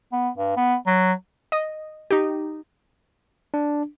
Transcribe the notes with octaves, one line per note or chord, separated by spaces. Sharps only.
B3
G2
B3
F#3
D#5
D#4 G4
D4